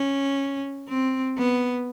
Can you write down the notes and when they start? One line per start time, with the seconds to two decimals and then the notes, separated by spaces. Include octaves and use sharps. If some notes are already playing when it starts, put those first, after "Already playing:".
Already playing: C#4
0.88 C4
1.37 B3